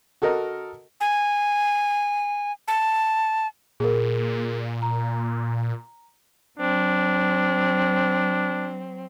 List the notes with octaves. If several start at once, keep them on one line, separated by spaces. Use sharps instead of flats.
F#4 A4 A#4 D#5
G#5
A5
A#2 G#4 A#4
A#5
F#3 C4 D4